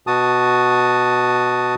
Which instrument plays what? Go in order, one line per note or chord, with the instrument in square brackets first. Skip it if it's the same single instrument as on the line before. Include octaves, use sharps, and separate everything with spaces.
[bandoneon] B2 F#4 A5 D#6